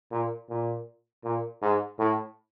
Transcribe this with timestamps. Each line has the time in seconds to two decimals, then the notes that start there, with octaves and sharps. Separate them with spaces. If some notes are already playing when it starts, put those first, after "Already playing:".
0.12 A#2
0.49 A#2
1.24 A#2
1.62 G#2
1.99 A2